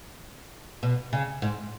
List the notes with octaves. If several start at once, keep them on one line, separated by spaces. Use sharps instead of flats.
B2
C#3
G#2